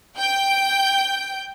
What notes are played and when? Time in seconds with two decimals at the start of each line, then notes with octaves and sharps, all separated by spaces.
0.18 G5 G6